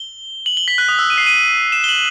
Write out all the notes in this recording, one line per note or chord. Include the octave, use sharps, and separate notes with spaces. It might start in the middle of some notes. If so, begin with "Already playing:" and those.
Already playing: G7
F#7
G7
B6
F#6
D#6
E6
D#7
C7
D#7
E7
G7
F#7